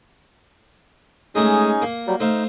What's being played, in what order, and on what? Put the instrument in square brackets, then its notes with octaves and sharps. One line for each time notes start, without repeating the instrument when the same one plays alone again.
[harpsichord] G#3 A3 [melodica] C#4 D#4 G#4
[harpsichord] A#3
[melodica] F#3 G3
[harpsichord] A3 C5 F5 [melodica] D#4